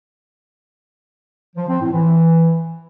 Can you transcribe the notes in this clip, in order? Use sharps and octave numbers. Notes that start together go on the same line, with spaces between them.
F3
C4
A2
E3